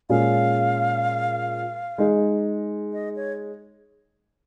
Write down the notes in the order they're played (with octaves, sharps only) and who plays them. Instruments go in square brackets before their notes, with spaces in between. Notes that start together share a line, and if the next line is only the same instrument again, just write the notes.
[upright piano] A#2 G#3 C#4 G#4 [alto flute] F5
[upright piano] G#3 D#4 G#4
[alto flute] D#5
C#5